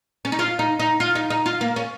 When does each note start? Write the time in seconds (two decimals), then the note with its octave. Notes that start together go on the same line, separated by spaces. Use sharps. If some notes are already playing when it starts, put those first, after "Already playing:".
0.25 C#4
0.32 D#4
0.39 F4
0.59 D#4
0.79 D#4
1.00 F4
1.15 D#4
1.30 D#4
1.46 F4
1.61 A#3
1.76 C#4